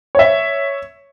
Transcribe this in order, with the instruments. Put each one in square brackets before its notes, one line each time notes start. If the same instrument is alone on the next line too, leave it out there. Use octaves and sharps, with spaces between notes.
[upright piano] C#5 E5